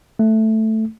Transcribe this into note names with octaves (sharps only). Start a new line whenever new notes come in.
A3